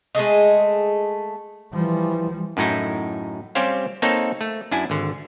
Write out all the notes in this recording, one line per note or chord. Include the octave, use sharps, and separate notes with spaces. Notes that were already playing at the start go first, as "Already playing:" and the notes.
G#3 A3 G#4 D#5
E3 F3 G3
F#2 A2 D#4 E4
G3 C4 C#4 G4 C5 F5
A#3 C4 D#4 A4 C#5
A3
F#2 D4 E4 G#5
G#1 D3